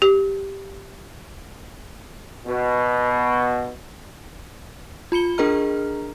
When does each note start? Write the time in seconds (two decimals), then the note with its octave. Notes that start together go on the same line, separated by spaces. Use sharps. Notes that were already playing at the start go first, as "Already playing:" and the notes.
0.02 G4
2.45 B2
5.12 F4 B5 C#7 G7
5.38 D4 G#4 A#4 D#5 A#5 F6